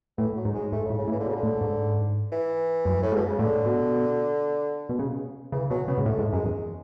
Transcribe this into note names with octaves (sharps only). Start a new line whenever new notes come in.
A2 E3
F#3
G#2
G#3
G#2 A3
C#3
A2
C#3
A2
E3
D3
B2
C#3
D3
A2
G#2
E3
F#2
A2
G#2
B2
C#3
A2 D3
B2
B2
C#3
C#3 E3
B2 F#3
C#3 B3
G#2
A2 A3
G#2
F#2 G#3
E2